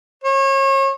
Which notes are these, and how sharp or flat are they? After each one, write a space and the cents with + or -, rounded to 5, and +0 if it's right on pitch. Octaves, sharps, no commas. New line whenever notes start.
C#5 -35